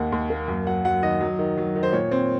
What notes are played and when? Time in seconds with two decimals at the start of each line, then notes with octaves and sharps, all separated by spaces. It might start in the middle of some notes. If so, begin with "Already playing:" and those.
Already playing: D#2 A#3 F#5
0.12 D#2
0.30 A#3
0.48 F#2
0.67 F#3 F#5
0.85 F#3 F#5
1.02 D#3 D#5
1.21 F#3
1.39 D#3
1.58 F#3
1.76 D#3
1.83 C5
1.93 A#2 C#5
2.12 C4